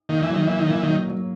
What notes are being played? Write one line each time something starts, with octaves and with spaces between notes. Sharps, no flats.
D#3 A#3
E3
F#3
D#3
E3 A#3
D#3
E3 A#3
D#3 F#3
F#3